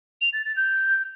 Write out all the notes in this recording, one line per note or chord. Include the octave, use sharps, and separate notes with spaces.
F7
A6
A6
G6